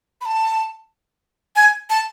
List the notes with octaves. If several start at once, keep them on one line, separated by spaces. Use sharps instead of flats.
B5
A5
G#5
A5